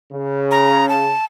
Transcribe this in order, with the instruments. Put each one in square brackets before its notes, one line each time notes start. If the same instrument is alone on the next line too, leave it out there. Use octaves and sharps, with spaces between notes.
[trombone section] C#3
[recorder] A#5
A5